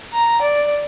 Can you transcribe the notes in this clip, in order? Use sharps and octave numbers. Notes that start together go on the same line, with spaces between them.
A#5
D5